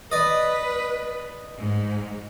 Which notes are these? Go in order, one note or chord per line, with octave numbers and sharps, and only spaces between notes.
B4 D5 D#5
G#2